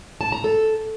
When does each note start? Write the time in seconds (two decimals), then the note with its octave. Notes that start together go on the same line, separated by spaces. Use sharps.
0.21 A5
0.32 A#5
0.44 A4